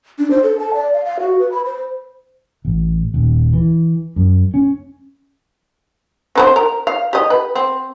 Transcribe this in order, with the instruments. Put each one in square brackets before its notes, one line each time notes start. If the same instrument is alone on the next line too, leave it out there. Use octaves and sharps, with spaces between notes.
[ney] D4
C5
A4
A5
D5
F5
F5
F#4
B4
B5
C5
[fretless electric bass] A1
D#1
E3
F#2
C#4
[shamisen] C4 B4 C5
A#4
F5
G4 D#5
B4
C4